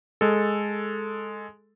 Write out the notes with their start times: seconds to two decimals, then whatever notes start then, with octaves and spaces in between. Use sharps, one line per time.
0.21 G#3 A4